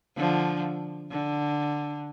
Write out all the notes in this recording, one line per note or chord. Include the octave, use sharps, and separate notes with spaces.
D3 F3
D3